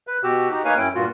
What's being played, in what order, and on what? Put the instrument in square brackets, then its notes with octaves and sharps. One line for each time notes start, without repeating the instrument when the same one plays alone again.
[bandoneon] B4
B2 F#4 G4 E6
D#4 F#4 G4
A#3 D#4 B4 C#5 F5 G#5
F#2 C#4 E4 G5
G2 A#2 F4 F#4